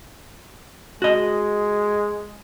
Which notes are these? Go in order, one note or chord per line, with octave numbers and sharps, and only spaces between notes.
G#3 F#4 D#5